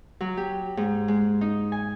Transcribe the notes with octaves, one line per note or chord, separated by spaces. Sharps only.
F#3
G4
G#2
G#3
D#4
G#5